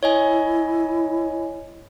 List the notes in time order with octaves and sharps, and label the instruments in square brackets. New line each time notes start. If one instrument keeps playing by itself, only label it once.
[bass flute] E4 [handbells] C#5 D#5 G#5